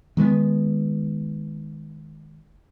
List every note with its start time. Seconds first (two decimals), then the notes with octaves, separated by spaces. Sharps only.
0.17 D#3 G#3 A#3 B3